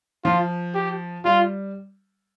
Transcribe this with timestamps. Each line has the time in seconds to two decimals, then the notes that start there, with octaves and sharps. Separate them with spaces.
0.24 F3 F4
0.75 G4
1.25 G3 F4